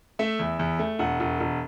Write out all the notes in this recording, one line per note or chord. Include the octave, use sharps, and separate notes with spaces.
A3 E5
E2
E2
A3
E1 F#5
E1
E1